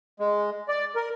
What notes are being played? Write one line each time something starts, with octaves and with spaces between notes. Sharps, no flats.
G#3
D5
A#4